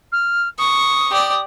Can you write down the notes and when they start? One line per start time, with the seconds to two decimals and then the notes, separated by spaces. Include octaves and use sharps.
0.12 F6
0.58 C#6 D#6
1.11 G4 D5